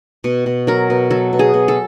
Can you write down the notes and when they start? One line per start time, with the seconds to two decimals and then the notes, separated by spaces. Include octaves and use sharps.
0.24 B2
0.46 B2
0.67 F#3 A#4
0.90 B2
1.11 F#3 A4
1.33 B2
1.39 G#4
1.54 B2
1.68 A4